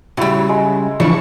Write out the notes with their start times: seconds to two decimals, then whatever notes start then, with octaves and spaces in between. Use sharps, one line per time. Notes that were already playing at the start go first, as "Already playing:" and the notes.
0.17 C#3 F#3 G3 E4
0.49 G#3
1.00 C#3 E3 F3 D4 E4 C#6